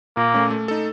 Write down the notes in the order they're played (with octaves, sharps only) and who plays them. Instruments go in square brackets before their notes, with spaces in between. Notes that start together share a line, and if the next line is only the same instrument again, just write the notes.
[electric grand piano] A#2 [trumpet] A#3
[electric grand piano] A3 C#4
A3
D#4 A4